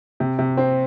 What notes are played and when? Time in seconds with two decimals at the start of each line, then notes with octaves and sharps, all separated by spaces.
0.20 C3
0.39 C3
0.57 C4